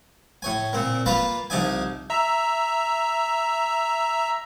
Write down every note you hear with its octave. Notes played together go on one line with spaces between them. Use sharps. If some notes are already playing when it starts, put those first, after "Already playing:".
A2 C#5 G#5
A#2 C4 A#4
A#3 F4 B4 F5 A5 A#5
C2 F3 D#4 D5 E5 G#5
E5 A#5 E6